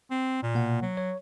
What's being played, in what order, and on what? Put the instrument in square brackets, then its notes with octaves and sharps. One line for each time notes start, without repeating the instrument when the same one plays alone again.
[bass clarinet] C4
A#2
[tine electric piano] B2 A#3 F#5
[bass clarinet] F#3
[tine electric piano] C#5